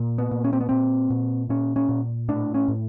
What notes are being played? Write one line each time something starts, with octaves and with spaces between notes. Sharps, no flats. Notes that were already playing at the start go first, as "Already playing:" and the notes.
Already playing: A#2
B3
A#2
C#4
C4
B3
A#2 C4
A#2
A#2 C#4
C#4
A#2
A2 D4
C#4
A2